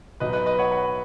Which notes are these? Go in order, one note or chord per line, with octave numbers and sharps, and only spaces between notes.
B1 B2 F#3 D#4 B4 D#5
B4 D#5
B4 D#5
C#5 F#5
F#5 B5